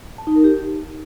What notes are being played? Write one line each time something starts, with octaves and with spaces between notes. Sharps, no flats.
A5
D#4
A#4
G4